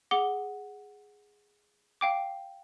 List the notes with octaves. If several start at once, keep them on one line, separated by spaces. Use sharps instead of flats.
G#4 F#5 D6 G7
F5 G5 D6